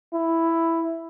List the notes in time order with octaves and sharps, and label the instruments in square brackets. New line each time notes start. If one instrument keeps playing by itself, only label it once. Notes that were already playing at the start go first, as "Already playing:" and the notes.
[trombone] E4